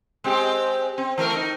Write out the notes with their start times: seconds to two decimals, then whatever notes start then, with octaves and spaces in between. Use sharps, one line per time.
0.24 G#3 C4 G4
0.98 C4
1.18 E3 A3 A#4
1.36 D#4